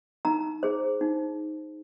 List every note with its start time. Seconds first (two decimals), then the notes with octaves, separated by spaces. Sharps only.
0.25 D#4 A#5
0.63 G#4 C5
1.01 D#4